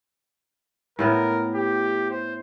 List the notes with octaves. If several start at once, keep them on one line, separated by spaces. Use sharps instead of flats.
A2 B3 A#4
G4
C5